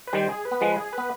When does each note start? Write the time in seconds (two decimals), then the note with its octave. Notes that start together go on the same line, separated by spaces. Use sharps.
0.07 B4
0.13 D#3 G3 C5
0.29 G#4
0.45 B4
0.51 B3
0.61 F3 G#3 B4
0.76 G#4
0.93 B4
0.98 B3